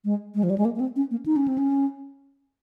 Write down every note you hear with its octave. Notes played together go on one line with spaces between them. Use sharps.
G#3
G#3
F3
G3
G#3
A#3
A#3
C4
C#4
A#3
D#4
C#4
C4
C#4